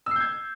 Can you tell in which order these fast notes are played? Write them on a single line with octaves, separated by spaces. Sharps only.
E6 C7 G6 G#6